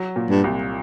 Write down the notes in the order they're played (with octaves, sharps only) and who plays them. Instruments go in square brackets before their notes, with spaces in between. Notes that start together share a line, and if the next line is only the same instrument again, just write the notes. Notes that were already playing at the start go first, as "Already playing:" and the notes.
Already playing: [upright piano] F#3
A#2
[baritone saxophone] G2
[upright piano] C2